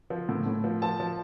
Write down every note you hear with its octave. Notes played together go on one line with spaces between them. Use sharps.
F3
A2
A2
F3
F3 A5
F3